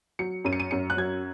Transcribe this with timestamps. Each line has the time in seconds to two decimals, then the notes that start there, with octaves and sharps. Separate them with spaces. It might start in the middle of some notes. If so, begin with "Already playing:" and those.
0.19 F#3 C#7
0.45 F#2 D#7
0.53 C#7
0.60 D#7
0.71 F#2 C#7
0.90 F#6
0.97 F#3 G#6